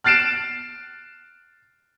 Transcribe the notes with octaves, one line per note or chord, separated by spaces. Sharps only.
F6 F#6 A6 C7 D7 E7